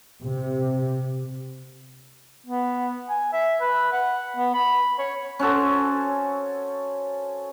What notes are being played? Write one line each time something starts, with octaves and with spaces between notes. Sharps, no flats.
C3
B3
G#5
E5
B4
F#5
B3
B5
C#5
C#4 F#4 A4 C5